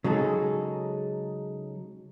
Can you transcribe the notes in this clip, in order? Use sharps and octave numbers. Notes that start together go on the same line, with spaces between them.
C#3 F#3 G#3 D#4 A4